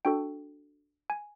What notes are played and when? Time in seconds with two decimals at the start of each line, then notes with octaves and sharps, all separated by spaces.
0.05 D4 F#4 A4 G5
1.10 G#5